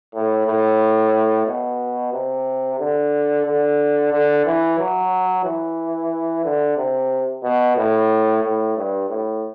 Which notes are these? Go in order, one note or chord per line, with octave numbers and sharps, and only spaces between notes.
A2
A2
B2
C3
D3
D3
D3
E3
F#3
E3
D3
C3
B2
A2
A2
G2
A2